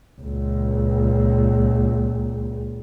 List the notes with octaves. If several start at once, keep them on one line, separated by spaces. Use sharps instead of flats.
C#2 A#2